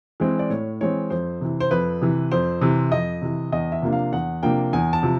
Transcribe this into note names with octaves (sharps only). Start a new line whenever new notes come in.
E3 G#3 C4
D5
A2 C#5
E3 G#3 C4 C#5
F2 C5
C3 E3
C5
F2 B4
C3 E3
F2 C5
C3 E3
F2 D#5
C3 E3
E2 D#5
E5
C3 F3 A#3 D4
F5
E2 F#5
C3 F3 A#3 D4 G5
E2 G#5
A5
C3 F3